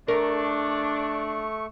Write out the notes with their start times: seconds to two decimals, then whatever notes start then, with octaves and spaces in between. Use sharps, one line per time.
0.08 A3 D4 A#4 C#6